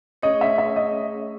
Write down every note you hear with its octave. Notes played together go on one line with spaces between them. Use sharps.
A3 C#4 G#4 C#5 D#5
E5
E5
D#5